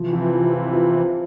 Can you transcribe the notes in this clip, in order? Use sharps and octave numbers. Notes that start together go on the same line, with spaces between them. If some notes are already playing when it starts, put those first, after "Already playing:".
Already playing: C3 E3 F3
F3
F3
F4
F4
C4